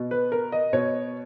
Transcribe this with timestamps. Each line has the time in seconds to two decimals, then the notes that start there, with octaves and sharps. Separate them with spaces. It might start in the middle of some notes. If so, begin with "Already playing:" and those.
Already playing: B2
0.11 B4
0.32 A#4
0.52 D#5
0.73 B2 C#5